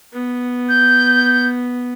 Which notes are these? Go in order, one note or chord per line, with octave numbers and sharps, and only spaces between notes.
B3
G6